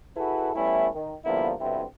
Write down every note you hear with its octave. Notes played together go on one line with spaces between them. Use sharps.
E4 F#4 G#4 A4 B4
G3 A3 B3 C#4 E4
D#3
D3 F3 G3 A#3 B3 E4
G2 B2 D3 C4 E4